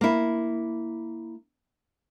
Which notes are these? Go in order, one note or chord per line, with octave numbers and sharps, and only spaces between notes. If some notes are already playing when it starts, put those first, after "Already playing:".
A#3 E4